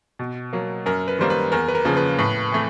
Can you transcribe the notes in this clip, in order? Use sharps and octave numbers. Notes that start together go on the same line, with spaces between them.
B2
F#3 A#3
F#2 A#4
B4
D#3 G3 A#3 C5
B4
E2 A#4
B4
A#4
C#3 F3 A#3
B4
A2 B4
E3 A3